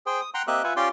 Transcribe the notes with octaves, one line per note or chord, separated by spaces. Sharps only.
G#4 C5 G5
D#6
F#5 G5 A#5 C6
A#3 C4 G4 D#5 E5 F#6
F4 B4 E5 F#5 G#5
C#4 F4 G4 D5 G5 C6